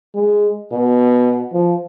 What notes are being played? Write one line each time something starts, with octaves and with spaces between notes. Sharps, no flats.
G#3
B2
F3